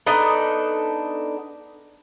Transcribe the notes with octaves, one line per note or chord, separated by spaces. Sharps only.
B3 D4 D#4 A4